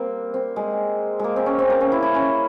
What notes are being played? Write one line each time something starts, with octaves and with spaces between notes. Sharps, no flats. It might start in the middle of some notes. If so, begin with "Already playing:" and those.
Already playing: G3 A#3 C4
C4
G#3
G#3 A#3
C4
C#4
C4
A#3
C#4
E4
E4
C#4